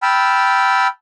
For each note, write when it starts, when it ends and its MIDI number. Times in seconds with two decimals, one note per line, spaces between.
0.03 0.87 79
0.03 0.87 81
0.03 0.87 83
0.03 0.87 88
0.03 0.87 89